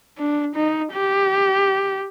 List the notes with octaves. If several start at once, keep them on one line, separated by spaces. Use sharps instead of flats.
D4
D#4
G4